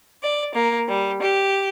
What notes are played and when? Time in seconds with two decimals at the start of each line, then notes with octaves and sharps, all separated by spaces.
0.23 D5
0.54 A#3
0.88 G3
1.21 G4